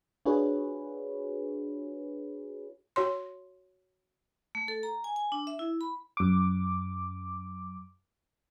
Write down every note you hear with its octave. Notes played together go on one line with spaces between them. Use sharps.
D4 F4 F#4 G#4 B4 C#5
F#4 C#5 C6
A3
A4
A#5
G#5
G#5
D4
E5
E4
B5
F#2 D6